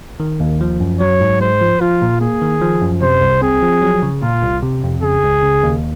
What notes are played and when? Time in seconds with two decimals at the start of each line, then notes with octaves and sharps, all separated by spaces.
0.20 D#3
0.40 D#2
0.61 F3
0.80 F#2
1.00 F#3 C#5
1.20 G#2
1.41 G#3 C5
1.61 F3
1.80 F3 F4
2.02 A#2
2.21 A#3 G#4
2.42 D#3
2.62 F3
2.81 F#2
3.02 C3 C5
3.21 C2
3.42 C4 G#4
3.62 F3
3.82 F#3
4.03 C#3
4.23 A#2 F4
4.42 C2
4.62 C3
4.83 F2
5.03 C#3 G#4
5.23 C#2
5.43 C#3
5.63 D#2